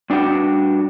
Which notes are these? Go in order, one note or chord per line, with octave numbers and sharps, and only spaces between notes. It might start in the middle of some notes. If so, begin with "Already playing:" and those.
G2 D4 F#4 A4 G5